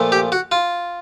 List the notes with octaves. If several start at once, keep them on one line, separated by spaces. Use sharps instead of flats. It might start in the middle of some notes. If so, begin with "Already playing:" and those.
Already playing: A#2 F3 A3
G4
F#4
F4